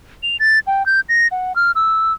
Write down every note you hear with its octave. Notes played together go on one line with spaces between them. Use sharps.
F7
A6
G5
G6
A#6
F#5
F6
E6